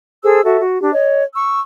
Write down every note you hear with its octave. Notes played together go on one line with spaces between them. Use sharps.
G#4 A4 C5 E6
F#4 A4 E5
F#4
D4 G4
C#5 D#5
C#6 E6